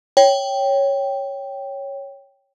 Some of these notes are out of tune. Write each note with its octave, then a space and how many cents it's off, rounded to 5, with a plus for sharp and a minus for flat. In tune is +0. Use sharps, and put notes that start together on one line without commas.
C#5 +0 G5 +0